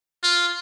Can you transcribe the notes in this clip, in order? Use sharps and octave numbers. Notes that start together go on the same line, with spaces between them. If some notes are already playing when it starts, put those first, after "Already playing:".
F4